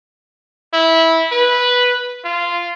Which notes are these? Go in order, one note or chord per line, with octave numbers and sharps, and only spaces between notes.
E4
B4
F4